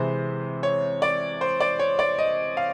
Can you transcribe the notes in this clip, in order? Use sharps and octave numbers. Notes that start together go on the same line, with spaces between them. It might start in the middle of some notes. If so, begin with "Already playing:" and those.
Already playing: C3 E3 G#3 C5
C#5
D5
C5
D5
C#5
D5
D#5
F5